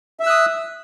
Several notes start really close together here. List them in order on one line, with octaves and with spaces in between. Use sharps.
E5 E6 F#6 D#6